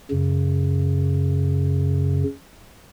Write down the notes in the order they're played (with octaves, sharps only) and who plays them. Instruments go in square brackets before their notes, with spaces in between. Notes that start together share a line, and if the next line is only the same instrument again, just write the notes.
[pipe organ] F#2 C#3